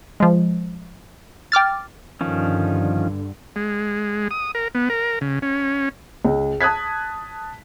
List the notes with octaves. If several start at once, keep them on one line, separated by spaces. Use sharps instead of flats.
F3 G#3
G5 D6 F6 A6
G2 D3 D#3 F3 C#4
G#3
D#6
A#4
B3
A#4
C#3
C#4
C#2
A5 D#6 F#6 G#6 B6